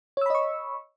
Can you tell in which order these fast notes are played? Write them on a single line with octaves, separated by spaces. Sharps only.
C#5 E6 B5 D#5 C#6